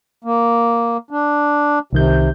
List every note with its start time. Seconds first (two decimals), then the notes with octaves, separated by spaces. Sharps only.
0.24 A#3
1.11 D4
1.93 C2 C3 D#3 G6